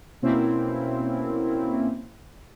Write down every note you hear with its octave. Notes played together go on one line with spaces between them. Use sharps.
B2 A#3 C4 C#4 E4